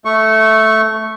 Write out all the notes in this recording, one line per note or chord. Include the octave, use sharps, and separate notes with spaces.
A3 C#6